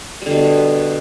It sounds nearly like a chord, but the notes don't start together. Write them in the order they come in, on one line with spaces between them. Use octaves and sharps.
G3 D3 B2